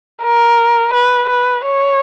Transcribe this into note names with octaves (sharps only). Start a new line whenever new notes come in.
A#4
B4
B4
C#5